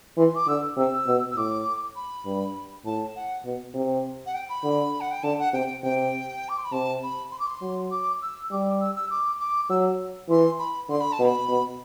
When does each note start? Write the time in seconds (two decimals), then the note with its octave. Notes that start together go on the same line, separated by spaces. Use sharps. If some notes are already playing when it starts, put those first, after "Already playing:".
0.18 E3 C6
0.35 D6
0.47 D3 E6
0.77 C3 E6
1.07 B2
1.31 E6
1.37 A2 D6
1.96 B5
2.25 G2
2.85 A2 A5
3.15 F#5
3.45 B2
3.75 C3
4.26 F#5
4.35 G5
4.49 B5
4.64 D3
5.00 F#5
5.11 G5
5.23 D3 A5
5.39 F#5
5.53 C3 G5
5.83 C3 G5
6.49 D6
6.57 C6
6.64 B5
6.72 C3 A5
7.02 B5
7.31 C6
7.39 D6
7.47 C6
7.62 F#3
7.91 D6
8.22 E6
8.51 G3 D6
8.80 E6
8.95 E6
9.10 D6
9.40 D6
9.69 F#3 E6
10.29 E3 C6
10.59 B5
10.89 D3 C6
11.00 B5
11.12 A5
11.19 B2
11.24 B5
11.49 B2